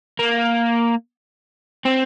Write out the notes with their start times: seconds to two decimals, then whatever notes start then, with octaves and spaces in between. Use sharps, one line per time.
0.19 A#3
1.85 C4